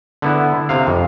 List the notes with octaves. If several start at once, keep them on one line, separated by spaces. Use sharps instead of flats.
D3 B3 E4
C3 F5
F2